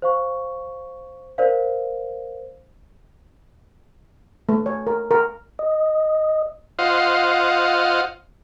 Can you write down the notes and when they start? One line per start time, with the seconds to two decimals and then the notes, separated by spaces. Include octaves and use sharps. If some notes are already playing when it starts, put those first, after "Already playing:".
0.02 C5 F5 C#6
1.38 A#4 C5 D5 F5
4.49 A3
4.66 C#5
4.87 A#4
5.11 A#4
5.59 D#5
6.79 F4 C5 D#5 F5 F#5